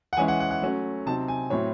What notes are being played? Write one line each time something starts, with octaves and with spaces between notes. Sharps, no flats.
F#5
E3 G#3 C#4 E4 G#5
F#5
F#5
F#5
F#3 A3 C#4
C3 F#3 C4 D#4 A5
G#5
A2 F#3 C4 E4 C#5